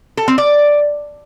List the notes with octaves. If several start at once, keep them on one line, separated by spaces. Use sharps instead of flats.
A4
C4
D5